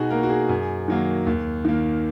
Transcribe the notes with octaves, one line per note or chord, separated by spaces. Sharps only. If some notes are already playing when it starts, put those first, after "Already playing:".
Already playing: B2 D#4 F#4 G#4
A#3 A#4
F#4
G#4
F#2
D#3 F#3 A#3
D#2
D#3 A#3